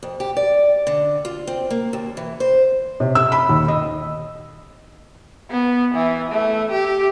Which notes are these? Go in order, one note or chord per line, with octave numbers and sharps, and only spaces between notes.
F2
G4
D5
D3
F4
C4
A#3
D#2
E3
C5
C3
E6
B5
D#2
D#5
B3
E3
A3
G4